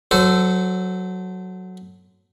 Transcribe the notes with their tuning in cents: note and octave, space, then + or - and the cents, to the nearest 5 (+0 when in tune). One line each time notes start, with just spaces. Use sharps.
F#3 +0 A4 +0 C5 -25